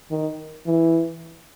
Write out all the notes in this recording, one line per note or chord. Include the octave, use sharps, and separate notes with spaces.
D#3
E3